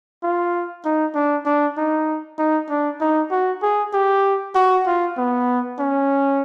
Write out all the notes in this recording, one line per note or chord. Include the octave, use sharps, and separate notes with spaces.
F4
D#4
D4
D4
D#4
D#4
D4
D#4
F#4
G#4
G4
F#4
F4
B3
C#4